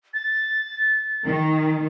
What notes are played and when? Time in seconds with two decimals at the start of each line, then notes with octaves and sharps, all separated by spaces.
0.14 A6
1.25 D#3